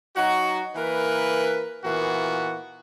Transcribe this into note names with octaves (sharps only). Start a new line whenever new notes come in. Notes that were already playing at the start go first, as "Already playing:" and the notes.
F#3 D#4 F#4
E3 A#3 A#4 B4
A#2 E3 A#3 B3 F#4